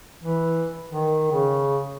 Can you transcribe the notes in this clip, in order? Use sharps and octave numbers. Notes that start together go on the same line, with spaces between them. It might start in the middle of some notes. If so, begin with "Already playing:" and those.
E3
D#3
C#3